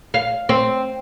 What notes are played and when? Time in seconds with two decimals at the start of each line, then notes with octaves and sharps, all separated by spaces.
0.14 F5
0.49 C4